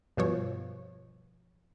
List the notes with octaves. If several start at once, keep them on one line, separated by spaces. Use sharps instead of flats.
G2 B2 F3 C#5